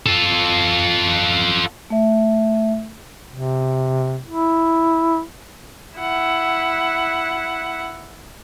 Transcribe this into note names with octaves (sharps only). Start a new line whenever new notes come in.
F4 A4
A3 E5
C3
E4
E4 F#5